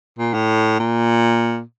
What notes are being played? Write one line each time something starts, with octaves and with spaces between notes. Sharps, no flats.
A#2
A2
A#2